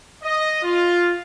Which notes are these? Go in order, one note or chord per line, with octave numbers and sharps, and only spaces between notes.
D#5
F4